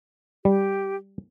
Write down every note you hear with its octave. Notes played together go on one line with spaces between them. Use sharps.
G3 G4